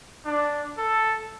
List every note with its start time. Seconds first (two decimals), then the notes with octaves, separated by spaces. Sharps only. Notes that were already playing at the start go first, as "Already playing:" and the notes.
0.25 D4
0.77 A4